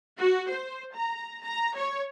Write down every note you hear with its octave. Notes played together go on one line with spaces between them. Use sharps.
F#4
C5
A#5
A#5
C#5